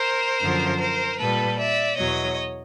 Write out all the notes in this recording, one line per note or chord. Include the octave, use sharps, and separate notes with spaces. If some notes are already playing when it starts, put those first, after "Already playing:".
Already playing: A#4 C5
F#2 D3 F3
A#4 C5
A#2 G3 A4 B4
D5 E5
E2 B2 F#3 C#5 D#5